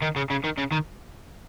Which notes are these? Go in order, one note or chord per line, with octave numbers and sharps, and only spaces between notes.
D#3
C#3
C#3
D#3
C#3
D#3